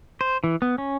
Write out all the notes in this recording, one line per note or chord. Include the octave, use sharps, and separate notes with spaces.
C5
E3
B3
C#4